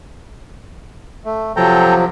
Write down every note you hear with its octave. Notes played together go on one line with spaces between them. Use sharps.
A3
C3 F3 F#3 A4 G5 A#5